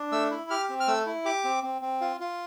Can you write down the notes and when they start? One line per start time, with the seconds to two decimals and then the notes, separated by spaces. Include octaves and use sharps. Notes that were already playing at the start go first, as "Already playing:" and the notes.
Already playing: D4
0.12 A3 E6
0.31 E4
0.50 G4 F6
0.69 C4
0.80 F6
0.88 A3 E6
1.06 E4
1.25 G4 D6
1.44 C4
1.63 C4
1.82 C4
2.01 F4
2.20 F4